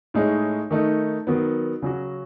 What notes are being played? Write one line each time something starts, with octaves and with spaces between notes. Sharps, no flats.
A2 G#3 D#4 G#4 C#5
D#3 A3 D#4
D#3 F#3 B3
C#3 F#3 C#4 F#4